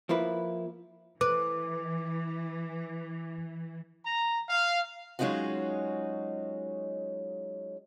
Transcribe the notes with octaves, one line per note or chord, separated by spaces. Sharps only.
F3 A#3 E4 B4
E3 B4 D6
A#5
F5
F#3 G#3 C#4 D#4 F4 F#4